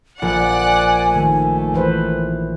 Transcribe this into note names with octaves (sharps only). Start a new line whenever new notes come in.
A#1 D5 F#5 G#5 F#6
D#3 A3
E3 B4 C5